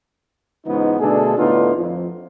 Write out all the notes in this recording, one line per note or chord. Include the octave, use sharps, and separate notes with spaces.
C#2 G#2 E3 B3 D#4
B2 D3 A3 D4 G#4 A4
A2 D3 B3 D#4 F4
F2